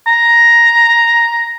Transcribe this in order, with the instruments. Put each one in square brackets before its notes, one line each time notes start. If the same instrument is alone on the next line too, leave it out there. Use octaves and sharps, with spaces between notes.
[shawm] A#5